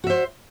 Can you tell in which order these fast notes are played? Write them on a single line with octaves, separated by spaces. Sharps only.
F#4 E5 C5